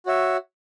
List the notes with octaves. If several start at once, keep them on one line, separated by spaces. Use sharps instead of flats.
F#4 C#5 E5